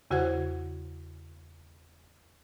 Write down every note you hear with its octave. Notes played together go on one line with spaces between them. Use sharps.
E2 C#3 F#4 C5 F#5 G#6